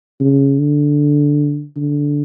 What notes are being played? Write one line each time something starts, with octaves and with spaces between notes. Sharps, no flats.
C#3
D3
D3